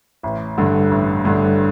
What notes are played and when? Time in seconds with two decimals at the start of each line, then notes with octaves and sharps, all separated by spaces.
0.23 A1
0.58 G2 D3
0.91 A1
1.25 G2 D3